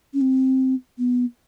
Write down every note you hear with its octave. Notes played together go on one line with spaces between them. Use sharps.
C#4
C4
B3